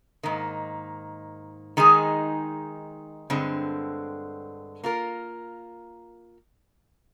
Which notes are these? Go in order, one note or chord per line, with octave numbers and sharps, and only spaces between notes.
G#2 D#3 A#3
D#3 G#3 D#4 G#4
G2 D3 G#3 C4
A#3 F4 A#4